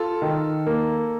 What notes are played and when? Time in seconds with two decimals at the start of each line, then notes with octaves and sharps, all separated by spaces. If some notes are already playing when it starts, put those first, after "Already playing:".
Already playing: F4 A4
0.22 D#3
0.67 A#3